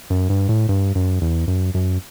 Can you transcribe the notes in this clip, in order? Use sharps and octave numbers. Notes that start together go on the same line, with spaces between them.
F#2
G2
A2
G2
F#2
E2
F#2
F#2